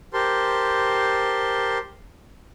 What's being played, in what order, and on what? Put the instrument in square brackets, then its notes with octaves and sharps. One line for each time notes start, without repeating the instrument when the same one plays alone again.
[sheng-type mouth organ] G4 A#4 C5 A5 C6